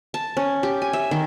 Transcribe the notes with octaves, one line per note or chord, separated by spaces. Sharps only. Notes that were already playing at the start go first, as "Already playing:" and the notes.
A5
C#4
G4
G#5
E5
D#3